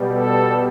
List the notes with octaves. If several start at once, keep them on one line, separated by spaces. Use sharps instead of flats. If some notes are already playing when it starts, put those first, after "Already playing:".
Already playing: B2 G3
A4